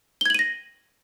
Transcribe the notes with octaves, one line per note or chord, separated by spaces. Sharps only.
G#6 A#6 D#7 F#7 G7